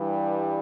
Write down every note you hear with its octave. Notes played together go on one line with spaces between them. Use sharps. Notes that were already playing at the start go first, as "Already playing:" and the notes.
Already playing: G2 E3 G3